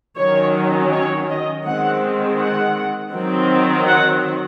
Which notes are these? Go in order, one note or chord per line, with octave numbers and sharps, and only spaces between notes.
D#3 F#3 C#4 C#5
C#5
D#5
D#3 G#3 C4 F#5
F#5
D#3 F#3 C4
F#5